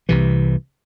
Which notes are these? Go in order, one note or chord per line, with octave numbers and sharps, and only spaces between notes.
C2 C3 E3